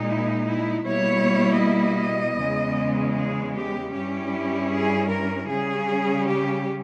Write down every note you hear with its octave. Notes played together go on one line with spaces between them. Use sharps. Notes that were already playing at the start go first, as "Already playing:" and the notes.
Already playing: A#2 G#3 D#4
E4
E4
B2 G3 A#3 E4 C#5
D#5
E2 C#3 G#3
G#4
G4
G2 G3 C#4 E4 G4
G#4
A#4
C#3 G3 C#4 G#4
G4